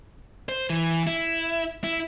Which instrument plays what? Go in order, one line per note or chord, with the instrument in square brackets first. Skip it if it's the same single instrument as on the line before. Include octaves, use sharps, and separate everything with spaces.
[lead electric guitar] C5
E3
E4
E4